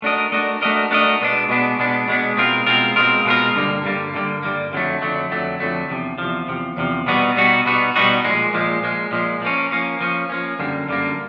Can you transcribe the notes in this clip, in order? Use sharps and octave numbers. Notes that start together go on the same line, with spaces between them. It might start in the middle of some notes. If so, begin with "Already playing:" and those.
A3 D4 F#4 A#4 D#5
A3 D4 F#4 A#4 D#5
A3 D4 F#4 A#4 D#5
A3 D4 F#4 A#4 D#5
B2 G#3 B3 D4
B2 G#3 B3 D4
B2 G#3 B3 D4
B2 G#3 B3 D4
B2 G#3 C4 F4 A#4
B2 G#3 C4 F4 A#4
B2 G#3 C4 F4 A#4
B2 G#3 C4 F4 A#4
G2 D3 G3 A#3
G2 D3 G3 A#3
G2 D3 G3 A#3
G2 D3 G3 A#3
F2 D3 F#3 A3
F2 D3 F#3 A3
F2 D3 F#3 A3
F2 D3 F#3 A3
E2 C3 F3
E2 C3 F3
E2 C3 F3
E2 C3 F3
B2 G3 B3 D#4 F#4
B2 G3 B3 D#4 F#4
B2 G3 B3 D#4 F#4
B2 G3 B3 D#4 F#4
A#2 F3 G#3
A#2 F3 G#3
A#2 F3 G#3
A#2 F3 G#3
F3 A#3 C#4
F3 A#3 C#4
F3 A#3 C#4
F3 A#3 C#4
F#2 D3 G3 A#3
F#2 D3 G3 A#3